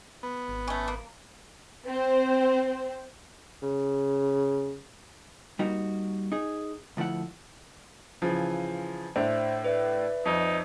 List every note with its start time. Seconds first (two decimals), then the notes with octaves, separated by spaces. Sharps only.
0.23 B3
0.48 G#1
0.67 A3 C#4
0.88 A#3
1.86 C4 C5
3.62 C#3
5.59 G3 A#3 D#4 F#4
6.32 D#4 G#4
6.97 D2 F3 A3 E4 F#5
8.22 C#3 E3 F3
9.16 A2 D4 C5 E5
9.64 B4 D5 E5
10.26 F2 D#4